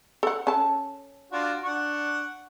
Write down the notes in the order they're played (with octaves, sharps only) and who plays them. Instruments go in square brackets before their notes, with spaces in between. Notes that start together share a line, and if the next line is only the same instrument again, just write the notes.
[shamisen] A4 F#5
C#4 A4 A5
[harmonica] D4 F4 F#4
D4 F#5 C#6